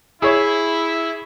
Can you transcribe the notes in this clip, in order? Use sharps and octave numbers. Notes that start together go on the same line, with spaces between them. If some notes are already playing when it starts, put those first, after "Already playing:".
E4 G#4 C#5